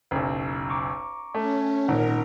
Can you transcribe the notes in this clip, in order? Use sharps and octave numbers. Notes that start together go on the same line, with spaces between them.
F#1 B1
A#5 C#6 D6
A3 C#4
G#1 A#2 D#4 A#4 F#5